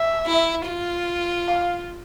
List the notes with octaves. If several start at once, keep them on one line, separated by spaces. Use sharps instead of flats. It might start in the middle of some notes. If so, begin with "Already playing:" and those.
Already playing: E5
E4
F4
F5